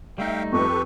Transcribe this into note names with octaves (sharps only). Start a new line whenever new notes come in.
G3 A3 D#4 E5 F5 G5
F2 G4 A4 B4 C#6